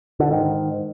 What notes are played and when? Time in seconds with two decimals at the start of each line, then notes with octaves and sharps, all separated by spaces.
0.20 D3
0.31 G#2 D#3